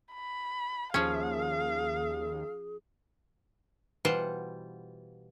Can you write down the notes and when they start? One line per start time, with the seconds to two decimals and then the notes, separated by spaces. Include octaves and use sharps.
0.13 B5
0.94 D#2 F3 C#4 G#4 F5
4.05 B2 E3 G3 F4 C5 F#5